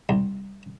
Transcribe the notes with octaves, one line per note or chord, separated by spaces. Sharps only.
C2